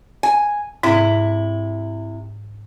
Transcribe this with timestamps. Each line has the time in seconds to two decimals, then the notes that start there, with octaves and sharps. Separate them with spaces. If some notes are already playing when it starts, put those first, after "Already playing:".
0.23 G#5
0.83 G#2 C3 E4